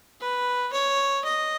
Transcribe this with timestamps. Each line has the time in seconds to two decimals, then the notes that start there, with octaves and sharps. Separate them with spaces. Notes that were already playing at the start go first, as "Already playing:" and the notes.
0.20 B4
0.73 C#5
1.24 D#5